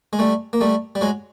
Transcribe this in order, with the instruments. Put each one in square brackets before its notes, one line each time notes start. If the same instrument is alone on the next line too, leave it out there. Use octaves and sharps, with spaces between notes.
[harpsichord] G#3
G3 A3
A#3
G3 A3
G3
F#3 G#3